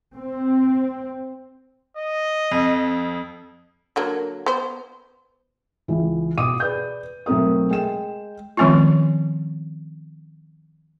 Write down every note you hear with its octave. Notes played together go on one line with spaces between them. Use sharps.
C4
D#5
F2
D3 F#3 A#3
B3 C5
C#2 E3
B2 D6 D#6 D#7
G#4 B4 D5 G6
B1 A3 C4 A#4 D#6
G#3 G5 E7
D#3 F3 G#3 C4 C#4 F4